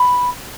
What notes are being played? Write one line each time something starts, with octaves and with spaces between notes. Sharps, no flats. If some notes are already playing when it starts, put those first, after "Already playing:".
Already playing: B5